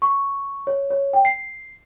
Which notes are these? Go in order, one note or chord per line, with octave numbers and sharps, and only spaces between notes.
C#6
C#5
C#5
G5
C7